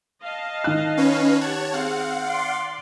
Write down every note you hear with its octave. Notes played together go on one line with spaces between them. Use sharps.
D#5 F5 A5
D#3 F#6
C#4 B4 C#5
G4 C#5 F#5 A5 G#6
C4 G#4 F5 F#5
D5 C6